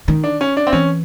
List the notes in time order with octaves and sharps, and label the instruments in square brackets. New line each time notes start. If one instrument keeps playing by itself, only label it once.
[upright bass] D#3
[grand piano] D4
C#4
D4
C4
[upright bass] E3 [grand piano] C#4